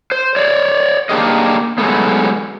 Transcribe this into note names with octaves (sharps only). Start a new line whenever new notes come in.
C5
C#5 D5
A#3 B3 D4 G4 G#4 D#5
F#3 G#3 A3 B3